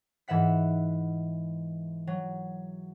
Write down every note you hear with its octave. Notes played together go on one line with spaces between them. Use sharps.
G#2 E3 E5 F#5 B6
F#3